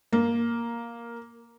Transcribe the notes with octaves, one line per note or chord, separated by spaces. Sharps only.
A#3